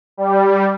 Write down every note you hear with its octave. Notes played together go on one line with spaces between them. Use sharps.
G3